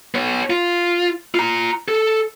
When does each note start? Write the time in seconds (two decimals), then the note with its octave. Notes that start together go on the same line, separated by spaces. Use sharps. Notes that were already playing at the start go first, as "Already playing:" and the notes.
0.15 B3 C#5
0.50 F4
1.35 F4 A#5
1.88 A4